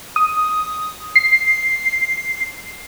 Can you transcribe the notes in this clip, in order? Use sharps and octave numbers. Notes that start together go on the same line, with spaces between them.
D#6
C7